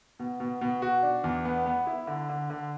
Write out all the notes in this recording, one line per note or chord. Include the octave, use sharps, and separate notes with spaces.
B2
B2
B2
F#4
D4
E2
B3
B3
E4
D3
D3
D3